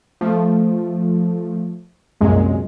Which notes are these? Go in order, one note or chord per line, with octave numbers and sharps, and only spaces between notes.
F3 A3
C2 F#2 A#2 G#3